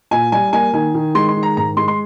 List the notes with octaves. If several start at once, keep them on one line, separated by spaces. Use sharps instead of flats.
A#2 G#5
G3 G#5
A#3 G#5
D#3 G#5
D#3
G#3 C6
C6
D#3
A#5
G#2 A#5
G#3 C6
C6